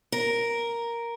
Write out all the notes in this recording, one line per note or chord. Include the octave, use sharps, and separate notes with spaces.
A#4